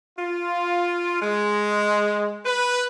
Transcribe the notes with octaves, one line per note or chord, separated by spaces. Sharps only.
F4
G#3
B4